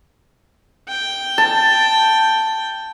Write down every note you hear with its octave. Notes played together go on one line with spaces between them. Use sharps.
G5
A5